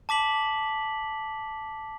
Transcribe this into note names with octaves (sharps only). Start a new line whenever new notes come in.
A5 D6 B6 F#7